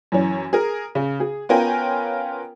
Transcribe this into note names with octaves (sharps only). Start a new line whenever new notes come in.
F#2 E3 C#4
G#4 A#4
C#3
G#4
B3 C#4 F4 A#4 G5 G#5